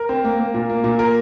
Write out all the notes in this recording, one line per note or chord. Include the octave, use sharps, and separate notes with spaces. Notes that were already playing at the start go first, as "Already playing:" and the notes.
Already playing: A#4
C4
A#3
A#3
A#2
A#3
A#2
A#4